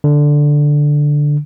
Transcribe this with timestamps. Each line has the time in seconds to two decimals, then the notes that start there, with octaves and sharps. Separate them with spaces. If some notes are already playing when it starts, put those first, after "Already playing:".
0.04 D3